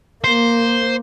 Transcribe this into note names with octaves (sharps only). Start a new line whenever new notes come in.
A#3 C5